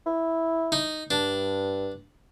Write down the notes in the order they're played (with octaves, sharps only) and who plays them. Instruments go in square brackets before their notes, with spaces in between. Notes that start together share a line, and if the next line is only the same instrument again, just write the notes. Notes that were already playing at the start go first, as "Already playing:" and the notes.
[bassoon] E4
[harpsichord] D#4
[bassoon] G2 [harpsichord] D4